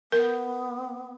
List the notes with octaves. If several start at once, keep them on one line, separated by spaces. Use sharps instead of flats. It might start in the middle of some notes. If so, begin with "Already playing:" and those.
B3 A#4